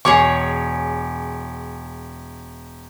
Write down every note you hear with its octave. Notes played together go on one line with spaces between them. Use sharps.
E1 G#4 C#5 C#6 D6